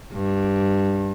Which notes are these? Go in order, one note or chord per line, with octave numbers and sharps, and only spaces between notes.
G2